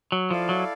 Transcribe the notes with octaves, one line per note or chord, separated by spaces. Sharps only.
F#3
F3 E4 A4 D5 F5
F#3